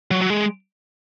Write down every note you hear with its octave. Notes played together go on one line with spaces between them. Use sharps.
F#3
F#3
G#3